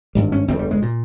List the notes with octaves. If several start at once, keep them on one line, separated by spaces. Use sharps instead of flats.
G#1 G2 G3
C#4
G1 F2 C#3 C4
G3
G#3
A#2